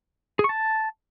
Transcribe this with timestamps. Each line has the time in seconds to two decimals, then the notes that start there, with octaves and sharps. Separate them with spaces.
0.39 G#4
0.44 C#6
0.49 A5